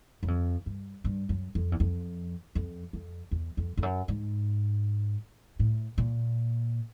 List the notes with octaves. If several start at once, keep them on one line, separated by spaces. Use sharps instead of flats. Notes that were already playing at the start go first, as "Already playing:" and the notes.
F#2
F2
G2
G2
F#2
F2
E2
F2
F2
F2
E2
F2
F2
F#2
G#2
A2
A#2